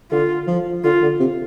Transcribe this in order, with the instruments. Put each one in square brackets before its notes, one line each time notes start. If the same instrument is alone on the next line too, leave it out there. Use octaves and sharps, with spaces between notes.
[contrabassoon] D3 [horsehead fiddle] F4
[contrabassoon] F3
[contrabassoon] D3 [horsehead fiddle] F4
[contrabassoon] D3
C3